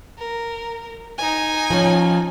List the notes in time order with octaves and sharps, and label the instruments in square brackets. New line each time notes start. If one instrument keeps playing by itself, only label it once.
[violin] A#4
D#4 G#5
[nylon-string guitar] F3 C#4